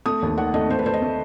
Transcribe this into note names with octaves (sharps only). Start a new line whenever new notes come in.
A3 D#6
D#2
D#3 F#5
A3 D#5
A3 C5
B4
A3 C5
D#5
A3